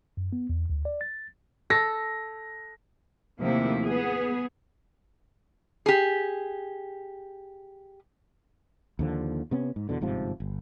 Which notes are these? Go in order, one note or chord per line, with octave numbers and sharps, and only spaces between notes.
F#2
B3
E2
D2
D5
A6
A4 A#6
D#2 C3 F3 A3 A#3 E4
B3 G#4
G4 G#4
D#2 D3 F3
C3 B3 C#4
G#2
E2 B2 D3
G1 G#2 C3 F3
G1